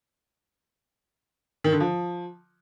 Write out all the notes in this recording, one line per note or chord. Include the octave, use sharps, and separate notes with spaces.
D#3
D3
F3